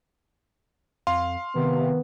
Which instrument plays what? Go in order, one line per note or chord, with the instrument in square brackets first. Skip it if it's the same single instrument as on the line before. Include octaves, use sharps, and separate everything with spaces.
[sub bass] F2 [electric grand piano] F5 C6
[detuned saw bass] C3 [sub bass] D#3 [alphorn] B3